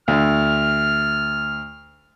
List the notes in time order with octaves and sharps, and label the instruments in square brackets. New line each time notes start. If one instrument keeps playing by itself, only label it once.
[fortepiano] D2 [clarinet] F6